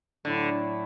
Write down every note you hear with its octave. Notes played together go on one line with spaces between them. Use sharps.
A2 D3 F#3 A3 E4